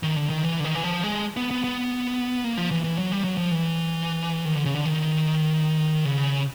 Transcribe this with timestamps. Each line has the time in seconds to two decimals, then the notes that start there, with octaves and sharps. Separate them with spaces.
0.03 D#3
0.16 D3
0.30 D#3
0.43 E3
0.60 D3
0.64 D#3
0.75 E3
0.84 F3
1.03 G#3
1.37 B3
1.51 B3
1.64 B3
2.44 A#3
2.57 F3
2.71 E3
2.84 E3
2.99 F#3
3.12 G3
3.24 F#3
3.38 F3
3.51 E3
4.45 D#3
4.55 D3
4.65 C#3
4.75 D3
4.85 D#3
6.05 C#3